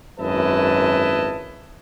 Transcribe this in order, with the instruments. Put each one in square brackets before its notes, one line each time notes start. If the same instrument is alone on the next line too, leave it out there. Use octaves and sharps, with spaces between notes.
[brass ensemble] G#1 F#2 E4 B4 D#5 A5